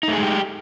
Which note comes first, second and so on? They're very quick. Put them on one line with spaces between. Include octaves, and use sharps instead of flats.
D#4 A3 G#4 G#3 G4